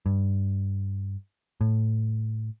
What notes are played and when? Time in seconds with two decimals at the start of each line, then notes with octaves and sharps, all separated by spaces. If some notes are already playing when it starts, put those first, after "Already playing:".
0.06 G2
1.61 A2